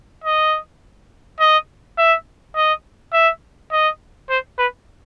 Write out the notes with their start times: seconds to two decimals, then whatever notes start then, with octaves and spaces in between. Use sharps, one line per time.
0.24 D#5
1.40 D#5
1.98 E5
2.56 D#5
3.13 E5
3.72 D#5
4.30 C5
4.58 B4